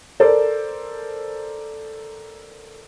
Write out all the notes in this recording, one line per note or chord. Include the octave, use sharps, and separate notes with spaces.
A4 A#4 C5 D5